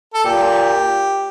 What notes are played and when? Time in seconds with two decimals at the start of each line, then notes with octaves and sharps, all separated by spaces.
0.14 A4
0.25 A#2 G4